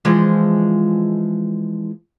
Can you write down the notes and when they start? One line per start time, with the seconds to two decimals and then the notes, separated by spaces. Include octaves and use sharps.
0.05 E3 F3 G#3